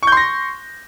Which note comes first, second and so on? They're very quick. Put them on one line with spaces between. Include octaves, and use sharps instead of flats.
C#6 G6 C6 A#6